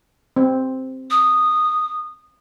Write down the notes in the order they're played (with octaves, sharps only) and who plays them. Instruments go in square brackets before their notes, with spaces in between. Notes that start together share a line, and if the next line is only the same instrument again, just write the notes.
[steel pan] C4
[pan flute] D#6